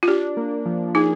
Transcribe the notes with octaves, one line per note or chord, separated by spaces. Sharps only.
F4
D4 G4
A#3
F3
D#4 G#4